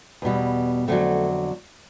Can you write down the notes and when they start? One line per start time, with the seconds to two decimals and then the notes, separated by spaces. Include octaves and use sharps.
0.22 E2 B2 G3
0.88 F2 D3 F#3 A3